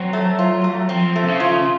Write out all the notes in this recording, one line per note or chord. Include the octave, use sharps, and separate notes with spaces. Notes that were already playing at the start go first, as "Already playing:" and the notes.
Already playing: F#3 C4
A3
F4
A3
F3 C4
A3
C3
C#3
F4
C#3